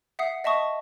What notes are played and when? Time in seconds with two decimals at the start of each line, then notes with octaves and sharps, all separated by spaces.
0.19 E5 F#5 D#6 C7
0.44 D#5 E5 A5 C#6 D#6